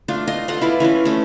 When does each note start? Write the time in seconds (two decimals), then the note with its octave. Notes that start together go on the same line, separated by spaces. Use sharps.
0.08 A3 D4 F4
0.27 F4 D#5 C6
0.48 F4 A4 F#5 C6
0.61 E4 B4 D5
0.80 E3 C#4 F4 B4
1.05 A3 C#4